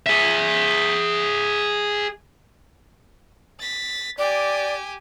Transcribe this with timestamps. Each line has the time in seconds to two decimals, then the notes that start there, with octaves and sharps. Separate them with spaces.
0.06 G#4 E5
3.60 A6 B6
4.18 G4 D5 G#5